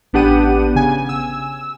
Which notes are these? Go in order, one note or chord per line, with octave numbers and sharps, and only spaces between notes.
A1 B3 D4 G4 F#5 D#7
C#3 G#5
E6